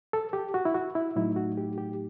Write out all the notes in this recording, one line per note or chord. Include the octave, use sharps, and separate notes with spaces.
A4
G4
F#4
E4
F#4
E4
A2 F#3 A3 D#4 E4
F#4
G4
G4